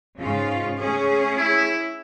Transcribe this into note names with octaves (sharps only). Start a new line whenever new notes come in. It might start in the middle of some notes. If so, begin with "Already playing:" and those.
G#2 C#3 F4
A3 C#4 G#4
E4